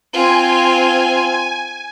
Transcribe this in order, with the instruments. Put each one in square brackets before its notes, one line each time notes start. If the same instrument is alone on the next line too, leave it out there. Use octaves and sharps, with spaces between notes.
[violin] C4 F4 [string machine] G#5